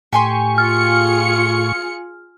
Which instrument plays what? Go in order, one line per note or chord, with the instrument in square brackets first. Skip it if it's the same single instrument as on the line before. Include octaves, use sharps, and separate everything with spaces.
[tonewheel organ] A2 C#6 [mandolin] G4 G#5 C6
[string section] F4 G#4 C#7 [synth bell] F6